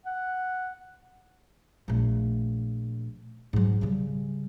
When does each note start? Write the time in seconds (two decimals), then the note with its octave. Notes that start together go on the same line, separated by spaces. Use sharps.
0.06 F#5
1.88 A#1 A3
3.53 G#2 F#3
3.81 C#3 G3